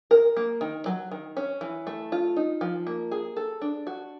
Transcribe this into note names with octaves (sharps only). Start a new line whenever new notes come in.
A#4
A#3
D#3
F#3
D#3
C#4
E3
A3
F4
D#4
F3
A#3
G#4
A4
D4
F#4